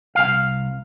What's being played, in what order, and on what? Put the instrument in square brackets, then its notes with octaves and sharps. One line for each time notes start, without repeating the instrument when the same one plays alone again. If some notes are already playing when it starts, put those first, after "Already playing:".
[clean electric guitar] C2 F5